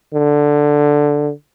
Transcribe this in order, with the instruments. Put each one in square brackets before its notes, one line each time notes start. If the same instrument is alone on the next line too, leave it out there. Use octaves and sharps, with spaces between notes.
[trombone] D3